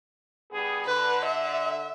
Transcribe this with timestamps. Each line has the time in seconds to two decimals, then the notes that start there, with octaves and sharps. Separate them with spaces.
0.51 G2 B3 G#4
0.86 D3 B4
1.25 E5